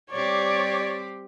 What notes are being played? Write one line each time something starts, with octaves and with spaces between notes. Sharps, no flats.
G3 C4 G4 C#5 D5